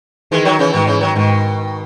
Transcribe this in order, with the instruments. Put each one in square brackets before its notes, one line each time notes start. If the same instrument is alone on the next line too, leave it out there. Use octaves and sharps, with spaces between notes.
[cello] D#3 [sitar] E3 G#3
[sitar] D#3 F#3
C#3 E3
[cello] G#2 [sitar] B2 D#3
[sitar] C#3 E3
D#3 F#3
[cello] G#2 [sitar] B2 D#3